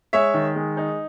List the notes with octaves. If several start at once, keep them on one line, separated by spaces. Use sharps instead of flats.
G#3 C#5 E5
D#3
G#3
D#4